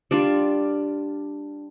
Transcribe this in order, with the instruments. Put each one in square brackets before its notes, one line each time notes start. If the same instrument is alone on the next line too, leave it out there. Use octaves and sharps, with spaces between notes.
[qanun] G3 D4 F4